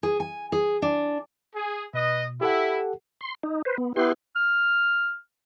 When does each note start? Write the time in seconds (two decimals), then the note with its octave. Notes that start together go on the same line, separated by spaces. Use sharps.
0.03 G#4
0.20 G#5
0.52 G#4
0.82 D4
1.54 G#4
1.94 B2 B4 D#5
2.41 E4 G4 A4 F#5
3.21 C6
3.43 D#4
3.65 B4 C5
3.78 B3
3.96 B3 E4 G4 B4 C6
4.36 F6